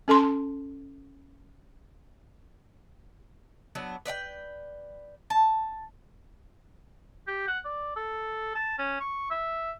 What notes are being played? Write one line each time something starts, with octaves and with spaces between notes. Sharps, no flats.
C#4 A4 A5 C6
F#3 B3 D4
B4 D5 F5 G5
A5
G4
F#5
D5
A4
A5
C#4
C#6
E5